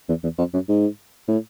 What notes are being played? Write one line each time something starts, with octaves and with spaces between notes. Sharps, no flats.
E2
E2
F2
F#2
G#2
A2